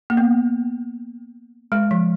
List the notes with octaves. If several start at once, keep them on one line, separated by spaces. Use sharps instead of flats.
A#3
B3
G#3
F3